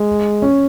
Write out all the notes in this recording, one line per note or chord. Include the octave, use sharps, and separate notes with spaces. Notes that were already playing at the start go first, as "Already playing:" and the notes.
Already playing: G#3
C#4